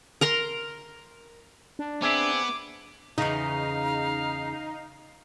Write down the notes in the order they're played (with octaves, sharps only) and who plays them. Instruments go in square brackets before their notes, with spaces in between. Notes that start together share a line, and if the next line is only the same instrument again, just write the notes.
[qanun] A#4 A#5 C6
[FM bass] D4
[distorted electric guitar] B3 [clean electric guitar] C4 G#4 E5 [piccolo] D6
[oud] E2 C#3 [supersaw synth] D#4 [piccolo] F5 [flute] A#5